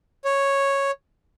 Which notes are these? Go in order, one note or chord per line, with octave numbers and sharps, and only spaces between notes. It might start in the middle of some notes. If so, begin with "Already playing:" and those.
C#5